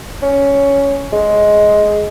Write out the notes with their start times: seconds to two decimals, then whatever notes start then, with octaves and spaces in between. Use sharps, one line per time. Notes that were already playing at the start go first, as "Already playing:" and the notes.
0.22 C#4
1.12 G#3